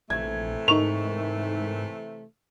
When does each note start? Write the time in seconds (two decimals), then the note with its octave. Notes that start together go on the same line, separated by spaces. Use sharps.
0.10 A#1 C3 E3 A3 G#6
0.68 G#2 D#4 A#4 C#6 F7